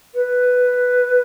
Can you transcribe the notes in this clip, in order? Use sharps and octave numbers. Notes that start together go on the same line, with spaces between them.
B4